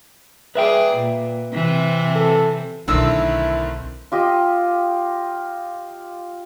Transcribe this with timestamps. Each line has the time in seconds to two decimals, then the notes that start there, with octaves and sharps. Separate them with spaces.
0.55 G#4 B4 D5 E5 G5
0.94 A#2
1.53 C3 E3 C4
2.15 A4
2.88 B1 D3 D#3 A3 C4 E4 E6
4.12 F4 G4 D#5